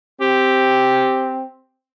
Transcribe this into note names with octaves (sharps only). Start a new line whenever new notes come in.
C4 G4